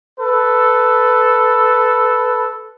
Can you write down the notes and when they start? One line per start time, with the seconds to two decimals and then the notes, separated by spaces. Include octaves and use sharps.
0.19 A4 B4